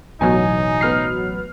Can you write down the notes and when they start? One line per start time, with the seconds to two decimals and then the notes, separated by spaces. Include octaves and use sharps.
0.21 A1 B2 F#3 D#4 G#5
0.81 B3 F6 C7